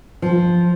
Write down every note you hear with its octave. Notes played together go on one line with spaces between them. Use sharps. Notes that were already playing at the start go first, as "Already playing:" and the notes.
F3